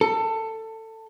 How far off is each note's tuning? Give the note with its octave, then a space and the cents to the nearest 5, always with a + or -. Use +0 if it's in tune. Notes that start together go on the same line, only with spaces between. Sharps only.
A4 +20